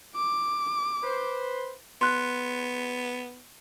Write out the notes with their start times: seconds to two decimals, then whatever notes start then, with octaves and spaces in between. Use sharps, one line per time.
0.16 D6
1.02 B4 C5
2.01 B3 C6 F#6